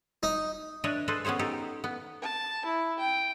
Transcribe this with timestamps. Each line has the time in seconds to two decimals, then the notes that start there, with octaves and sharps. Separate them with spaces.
0.23 D#4
0.84 D4 B4 C#5 D#5 E5
1.08 G#4 A4 B4 C5 D#5 A5
1.25 B3 C#4 G#4 C5 C#5
1.39 D#4 G4 A4
1.84 B3
2.22 A5
2.65 E4
2.99 G5